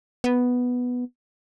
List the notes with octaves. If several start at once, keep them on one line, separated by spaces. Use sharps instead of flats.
B3